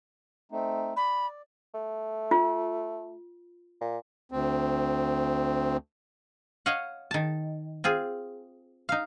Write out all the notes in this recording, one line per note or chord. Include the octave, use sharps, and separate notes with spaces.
A3 C4 D#4
D5 B5
A3
F4
A#2
D2 C4
C#5 D#5 F5 F#5
D#3 A5
C4 F4 G#4
D#4 F5